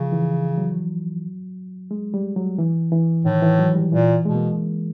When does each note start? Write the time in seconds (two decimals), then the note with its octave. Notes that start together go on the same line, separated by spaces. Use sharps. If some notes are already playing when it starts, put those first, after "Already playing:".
Already playing: C#3 F3
0.12 E3
0.58 F#3
1.91 G#3
2.14 G3
2.36 F#3
2.58 E3
2.92 E3
3.25 A2 D#3
3.42 E3
3.59 F#3
3.75 G3
3.92 A#2 E3
4.25 B2 G#3
4.35 A#3